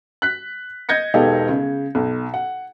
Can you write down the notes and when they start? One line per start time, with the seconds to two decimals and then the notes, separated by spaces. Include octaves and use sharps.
0.22 F#6 B6
0.89 D#5 G6 G#6 A#6 C#7
1.14 E1 B3 D#4 G4 A4 F5
1.49 C#3
1.95 B1
2.34 F#5